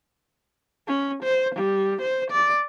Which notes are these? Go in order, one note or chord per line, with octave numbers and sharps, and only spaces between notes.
C#4
C5
G3
C5
D5